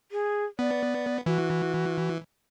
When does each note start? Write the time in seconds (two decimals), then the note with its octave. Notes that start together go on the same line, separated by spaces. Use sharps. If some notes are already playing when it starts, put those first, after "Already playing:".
0.12 G#4
0.59 B3 D5
1.26 E3 F#4